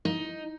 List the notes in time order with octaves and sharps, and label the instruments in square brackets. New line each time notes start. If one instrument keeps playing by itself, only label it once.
[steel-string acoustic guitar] D#4